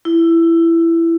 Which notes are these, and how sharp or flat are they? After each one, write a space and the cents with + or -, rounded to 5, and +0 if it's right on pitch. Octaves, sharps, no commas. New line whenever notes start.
E4 +15